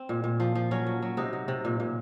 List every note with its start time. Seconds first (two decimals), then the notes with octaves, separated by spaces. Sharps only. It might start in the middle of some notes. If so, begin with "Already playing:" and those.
Already playing: C4
0.09 A#2
0.24 A#2
0.40 F3
0.55 F3
0.71 F#3 C#4
0.87 F#3
1.02 F#3
1.17 C3 D#4
1.33 F#3
1.48 C3
1.65 A#2
1.80 A#2